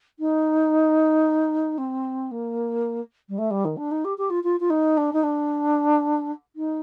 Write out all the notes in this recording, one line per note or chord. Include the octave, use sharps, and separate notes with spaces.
D#4
C4
A#3
G3
A3
G3
D#3
D4
D#4
G4
G4
F4
F4
F4
D#4
D4
D#4
D4
D#4